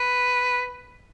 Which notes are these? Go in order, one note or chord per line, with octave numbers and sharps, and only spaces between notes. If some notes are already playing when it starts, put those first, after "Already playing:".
Already playing: B4